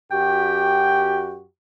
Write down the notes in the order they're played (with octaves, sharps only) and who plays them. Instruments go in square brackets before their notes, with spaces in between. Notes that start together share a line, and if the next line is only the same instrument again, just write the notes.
[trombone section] F#2 F#4 G4 [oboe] G5